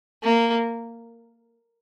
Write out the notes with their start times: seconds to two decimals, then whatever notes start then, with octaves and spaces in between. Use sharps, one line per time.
0.23 A#3